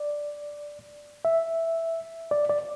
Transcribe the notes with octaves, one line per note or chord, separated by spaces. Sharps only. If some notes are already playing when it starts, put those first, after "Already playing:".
Already playing: D5
E5
D5
D5